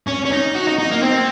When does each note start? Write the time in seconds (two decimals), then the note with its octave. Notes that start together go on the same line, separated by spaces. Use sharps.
0.08 C#4
0.26 C#4
0.32 D#4
0.55 F#4
0.67 D#4
0.78 D#4
0.91 A#3
1.02 C4